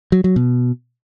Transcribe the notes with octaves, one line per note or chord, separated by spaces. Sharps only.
F#3
F#3
B2